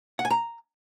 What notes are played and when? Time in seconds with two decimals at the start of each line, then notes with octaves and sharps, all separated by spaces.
0.19 F#5
0.25 G#5
0.30 A#5